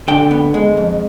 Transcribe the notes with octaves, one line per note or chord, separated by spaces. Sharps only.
D3 G5
B3
G#3
F2